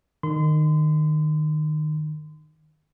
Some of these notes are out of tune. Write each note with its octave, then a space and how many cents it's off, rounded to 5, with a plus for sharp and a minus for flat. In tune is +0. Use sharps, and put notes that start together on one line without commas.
D#3 -25 C6 -35